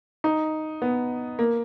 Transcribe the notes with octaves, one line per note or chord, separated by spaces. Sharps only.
D#4
B3
A#3